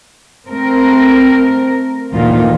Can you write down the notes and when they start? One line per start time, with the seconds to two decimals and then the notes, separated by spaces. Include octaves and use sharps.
0.48 A3 C4 A#4
2.11 D2 A#2 D#3 E3 F4